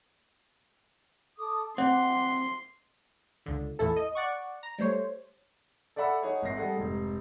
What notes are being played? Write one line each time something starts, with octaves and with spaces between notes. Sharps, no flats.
A4 D6 D#6
C4 E5 F#5 C6 D6
C#2 D3
A1 E2 E4 A4
D#5
D5 F#5 C#6
A#5
G3 A3 C5 C#5
A4 D5 E5 F#5 B5 E6
D#4 G#4 C#5 F#5
G#1 G#2 E5 A#6 C7
G3 G#4 A4 F#5 C7
F1 G#2